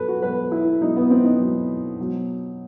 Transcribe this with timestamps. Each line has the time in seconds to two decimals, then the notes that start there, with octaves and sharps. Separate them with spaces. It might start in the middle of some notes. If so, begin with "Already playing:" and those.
Already playing: B2 F#3 A4 B4
0.08 F#4
0.22 B2 F#3 B4
0.51 E4
0.81 B2 F#3 D#4
0.96 B3
1.10 C4
1.24 D#4
1.39 B2 F#3
1.99 B2 F#3